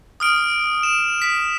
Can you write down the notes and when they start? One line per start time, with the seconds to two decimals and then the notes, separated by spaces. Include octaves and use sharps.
0.20 D#6 F6 D7
0.83 E7
1.22 B6